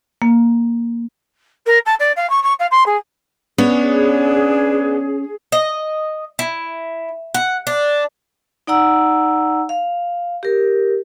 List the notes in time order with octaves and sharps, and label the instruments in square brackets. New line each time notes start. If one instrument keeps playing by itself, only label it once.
[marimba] A#3
[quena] A#4
A5
D5
F5
C#6
C#6
F5
C6
G#4
[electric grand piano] B3 [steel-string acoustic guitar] C#4 C#5 [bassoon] D4 [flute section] G#4
[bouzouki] D#5
E4
F#5
D4
[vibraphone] D#4 D5 F#5 A#5 E6
F5
G4 A#4